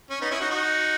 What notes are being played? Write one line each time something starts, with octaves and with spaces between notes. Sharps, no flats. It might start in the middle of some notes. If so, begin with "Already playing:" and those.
C#4
B3 D#4
C#4 E4
D#4 F#4
D#4 F#4